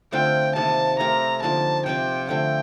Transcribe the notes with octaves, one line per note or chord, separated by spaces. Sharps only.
D3 A3 C4 F4 G5
C3 D#3 A#3 A5
A3 C4 G4 A#4 A#5
D3 F3 A#3 D#4 A5
C3 F3 C4 G5
D3 F3 A3 G5